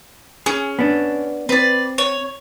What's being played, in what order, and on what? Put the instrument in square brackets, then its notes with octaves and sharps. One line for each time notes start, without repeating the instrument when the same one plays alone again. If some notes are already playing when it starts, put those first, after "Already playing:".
[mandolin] C#4 [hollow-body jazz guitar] G#4
[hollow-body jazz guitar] B3 D4
[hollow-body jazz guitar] C4 [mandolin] B4 D5
[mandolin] C#5